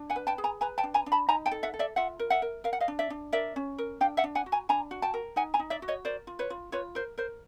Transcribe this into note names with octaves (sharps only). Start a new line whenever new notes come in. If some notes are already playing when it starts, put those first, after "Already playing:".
Already playing: D4
F#5 G#5
B4
G5 A5
G#4
G#5 A#5
B4 G#5 A#5
G5 A5
D4
G#5 A#5
D4
A5 B5
D#4 G#5 A#5
G5 A5
A4
E5 F#5
A4
D5 E5
F4 E5 F#5
A#4
E5 F#5
A#4
A#4 F5
F#5
D#5 F5
D4
D5 E5
D4
A#4 D5 E5
C#4
A#4
D4 F5 G5
E5 F#5
D4
F#5 G#5
F#4
G#5 A#5
D4 G#5 A#5
F#4
G5 A5
A#4
D#4 F#5 G#5
G#5 A#5
D#4
D5 E5
F#4
C#5 D#5
A#4 C5 D5
F4
B4 C#5
F4
F4 B4 C#5
A#4 C5
A#4 C5